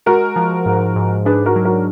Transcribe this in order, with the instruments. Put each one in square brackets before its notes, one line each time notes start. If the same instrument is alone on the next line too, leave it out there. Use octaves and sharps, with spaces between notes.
[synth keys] G#3 [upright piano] F#4 A#4
[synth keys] F3
G#2
G#2
[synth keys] D4 [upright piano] G#4 B4
[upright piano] F#4 A#4
[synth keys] F#3
[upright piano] F#4 A#4